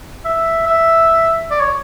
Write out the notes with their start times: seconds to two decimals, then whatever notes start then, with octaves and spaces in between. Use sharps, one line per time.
0.25 E5
0.67 E5
1.51 D5
1.60 C#5